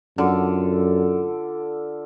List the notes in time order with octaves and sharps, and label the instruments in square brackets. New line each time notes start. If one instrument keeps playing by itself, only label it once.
[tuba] F#2 [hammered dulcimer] D3 [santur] F4 A4 D5